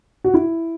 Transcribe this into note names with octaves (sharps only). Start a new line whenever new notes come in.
F#4
E4